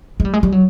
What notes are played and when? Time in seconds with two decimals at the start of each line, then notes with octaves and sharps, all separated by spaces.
0.20 G#3
0.25 G3
0.33 G#3
0.43 G3
0.52 F#3